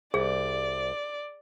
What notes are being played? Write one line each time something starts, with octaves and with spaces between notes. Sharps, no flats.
C2 G#4 D5